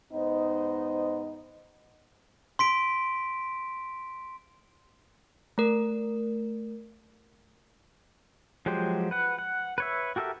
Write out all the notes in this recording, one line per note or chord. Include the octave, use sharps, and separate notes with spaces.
G#2 B3 D#4 C5 D#5
C6 B6 D7
A3 A#4
F3 F#3 G#3 G4 C5
B4 F#5
F#5
B4 C#5 E5
F#4 G4 A4 A#4 E5